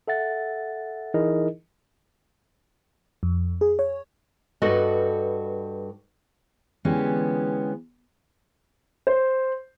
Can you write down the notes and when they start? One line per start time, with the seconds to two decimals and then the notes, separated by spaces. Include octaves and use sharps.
0.08 A4 E5 F#5 A6
1.14 E3 D#4 E4 G#4 A#4 D#5
3.23 F2
3.61 G#4
3.79 C#5
4.62 G2 F#4 A4 B4 D#5
6.85 D3 E3 G#3 B3 C#4 G4
9.07 C5